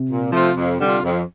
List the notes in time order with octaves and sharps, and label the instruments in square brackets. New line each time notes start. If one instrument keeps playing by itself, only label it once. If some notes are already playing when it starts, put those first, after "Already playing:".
Already playing: [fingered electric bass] C3
[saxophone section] A#2
F3 A3 C4 F4
F2
D3 G3 D4 F4
F2